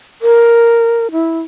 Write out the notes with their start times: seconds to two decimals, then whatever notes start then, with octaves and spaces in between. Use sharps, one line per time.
0.22 A#4
1.12 E4